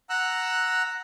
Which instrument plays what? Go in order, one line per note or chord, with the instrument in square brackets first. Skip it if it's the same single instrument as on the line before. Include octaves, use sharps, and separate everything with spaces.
[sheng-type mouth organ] F#5 A#5 E6 F#6